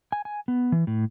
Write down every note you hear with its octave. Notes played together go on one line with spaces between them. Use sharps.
G#5
G#5
B3
E3
A2